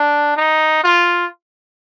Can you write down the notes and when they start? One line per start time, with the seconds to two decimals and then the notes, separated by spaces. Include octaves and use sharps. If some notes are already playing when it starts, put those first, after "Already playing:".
Already playing: D4
0.37 D#4
0.84 F4